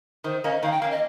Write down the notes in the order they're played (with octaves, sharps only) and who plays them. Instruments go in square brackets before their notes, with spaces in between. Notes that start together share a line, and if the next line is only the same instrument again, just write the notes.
[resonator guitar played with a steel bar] D#3 [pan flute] C5
[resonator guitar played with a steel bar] A#3 C#4 [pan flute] D#5
[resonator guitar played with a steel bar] D#3 [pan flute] F5
[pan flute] G5
[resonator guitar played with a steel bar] A#3 C#4 [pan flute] F5
[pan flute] D#5